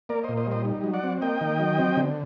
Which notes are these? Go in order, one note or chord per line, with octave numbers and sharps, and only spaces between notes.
A#3 A#4 D5
C5 D#5
A#2
C5 D#5
G3 C5 D#5
D#4
F#3
D5 F#5
C4
A#3 D#5 G5
D#3
F#3
C4
D3